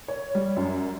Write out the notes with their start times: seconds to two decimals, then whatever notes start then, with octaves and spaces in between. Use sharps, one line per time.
0.08 C#5
0.35 G3
0.57 F#2